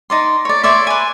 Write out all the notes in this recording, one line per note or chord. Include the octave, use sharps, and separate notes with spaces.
D#4 D5 C6
C#5 D5
C#5 D5 E5 C6
B4 G#5